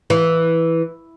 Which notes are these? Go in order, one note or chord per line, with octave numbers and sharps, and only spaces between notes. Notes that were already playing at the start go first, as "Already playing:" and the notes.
E3